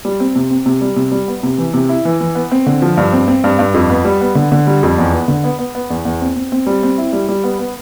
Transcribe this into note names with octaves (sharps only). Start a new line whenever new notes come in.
G3
C4
C3
C4
C3
G3
C3
G3
B3
C3
E3
C3
E4
E3
E3
B3
C4
D3
F3
G2
C4
C4
G2
G2
F2
B3
G3
B3
D3
D3
G3
F2
E2
B3
D3
B3
B3
B3
E2
E2
C4
C4
C4
G3
C4
E4
G3
G3
B3
B3